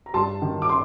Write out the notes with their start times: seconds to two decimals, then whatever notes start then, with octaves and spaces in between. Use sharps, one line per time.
0.06 A#5
0.14 G2 A5 C6
0.42 D#3
0.62 D6
0.69 C6